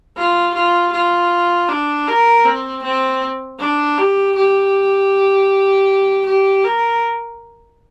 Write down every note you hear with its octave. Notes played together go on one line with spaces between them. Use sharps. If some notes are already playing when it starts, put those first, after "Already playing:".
F4
F4
F4
D4
A#4
C4
C4
D4
G4
G4
G4
A#4